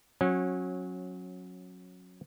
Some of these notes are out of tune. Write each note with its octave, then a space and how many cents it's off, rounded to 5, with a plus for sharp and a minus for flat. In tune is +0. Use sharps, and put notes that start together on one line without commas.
F#3 -15 C#4 -25